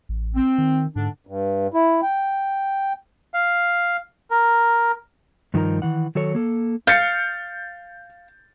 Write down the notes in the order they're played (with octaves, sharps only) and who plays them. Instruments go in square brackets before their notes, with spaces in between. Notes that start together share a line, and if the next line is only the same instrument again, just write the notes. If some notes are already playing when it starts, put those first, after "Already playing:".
[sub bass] A1
[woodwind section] C4
[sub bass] D#3
[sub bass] G#2 [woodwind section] D3 D4
[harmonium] G2
E4
G5
[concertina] F5
A#4
[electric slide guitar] G2 D#3 F3 D#4 A#4 A#5
D#3 E3 F#5
D#3 F#3 A4 C#5
A#3 A4
[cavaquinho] F5 [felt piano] G6 A6 C#7